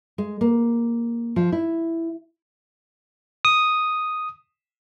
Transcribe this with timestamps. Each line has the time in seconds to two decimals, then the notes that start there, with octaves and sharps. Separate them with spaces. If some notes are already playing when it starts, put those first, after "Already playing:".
0.18 G#3
0.41 A#3
1.36 F3
1.52 E4
3.45 D#6